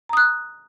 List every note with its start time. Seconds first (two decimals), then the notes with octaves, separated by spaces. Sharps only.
0.09 A#5
0.13 D#6
0.17 F#6